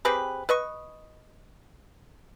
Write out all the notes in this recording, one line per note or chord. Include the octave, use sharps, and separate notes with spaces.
C4 G4 G#4 B4
B4 D#5 C#6